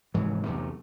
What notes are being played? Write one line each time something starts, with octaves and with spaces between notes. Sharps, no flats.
F1 G#2 E3 F#3
B1 E2 C3 A3